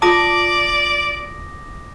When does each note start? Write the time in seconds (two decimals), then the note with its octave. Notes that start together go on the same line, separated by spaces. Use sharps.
0.02 F4 D5 A5 D6 D#6 A#6